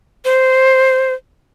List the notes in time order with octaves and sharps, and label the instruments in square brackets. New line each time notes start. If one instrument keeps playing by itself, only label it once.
[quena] C5